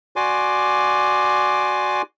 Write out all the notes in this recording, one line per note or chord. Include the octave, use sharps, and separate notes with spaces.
F#4 D5 G#5 C6 D6